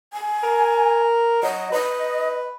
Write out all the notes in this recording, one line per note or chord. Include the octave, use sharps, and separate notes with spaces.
G#5
A#4
F#3 D#5
B4 D#5